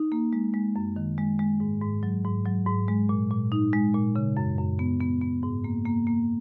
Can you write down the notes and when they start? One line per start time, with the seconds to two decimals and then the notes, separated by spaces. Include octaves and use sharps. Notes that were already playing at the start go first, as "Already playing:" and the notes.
Already playing: D#4
0.12 A#3
0.33 G#3
0.54 G#3
0.76 F#2
0.96 D#3
1.18 G#3
1.39 G#3
1.60 G#2
1.82 G#2
2.03 F#3
2.25 G#2
2.45 F#3
2.67 G#2
2.88 G#3
3.09 A#2
3.31 A#2
3.52 D#4
3.73 G#3
3.94 A#2
4.16 C#3
4.37 F#2
4.58 F#2
4.79 B3
5.01 B3
5.22 B3
5.43 G#2
5.64 A#3
5.85 A#3
6.07 A#3